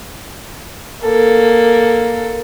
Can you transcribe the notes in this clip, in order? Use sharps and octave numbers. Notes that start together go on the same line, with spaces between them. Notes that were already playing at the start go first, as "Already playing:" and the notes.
A#3 A4